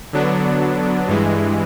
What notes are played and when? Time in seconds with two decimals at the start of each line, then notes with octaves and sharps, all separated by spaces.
0.13 D3 F#3 B3 D4
1.08 G2 E3 G#3